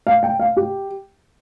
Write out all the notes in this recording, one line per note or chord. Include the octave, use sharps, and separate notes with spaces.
F5
G5
F5
G4